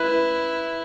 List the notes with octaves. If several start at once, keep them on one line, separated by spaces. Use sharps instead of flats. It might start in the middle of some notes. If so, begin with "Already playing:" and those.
Already playing: E4 B4